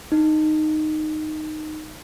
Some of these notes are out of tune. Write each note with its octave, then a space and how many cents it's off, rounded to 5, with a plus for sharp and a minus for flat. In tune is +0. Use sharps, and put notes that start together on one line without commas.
D#4 -10